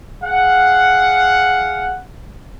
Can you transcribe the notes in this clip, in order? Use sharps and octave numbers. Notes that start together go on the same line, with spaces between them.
G#4 F5 F#5